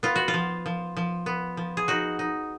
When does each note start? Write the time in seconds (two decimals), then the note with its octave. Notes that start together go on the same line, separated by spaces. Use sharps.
0.03 B3 F4
0.16 F#4
0.28 F4
0.34 F3
0.66 F3
0.97 F3
1.26 B3
1.57 F3
1.77 G#4
1.88 D#4 F#4
2.19 D#4